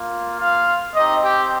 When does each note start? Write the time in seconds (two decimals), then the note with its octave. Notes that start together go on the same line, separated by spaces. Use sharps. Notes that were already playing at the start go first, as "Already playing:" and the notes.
Already playing: A#3 F4
0.39 F4 F5
0.95 C4 D#4 G4 D#5
1.23 G4 G5